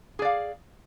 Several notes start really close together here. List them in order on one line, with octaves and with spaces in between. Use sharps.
G#4 D5 F5